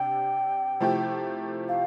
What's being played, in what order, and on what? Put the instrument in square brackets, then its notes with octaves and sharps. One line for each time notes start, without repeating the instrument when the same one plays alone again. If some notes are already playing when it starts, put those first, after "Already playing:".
Already playing: [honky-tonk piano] C3 D4 G4 [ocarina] G5
[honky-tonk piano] C3 F3 A3 E4 G4
[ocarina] F5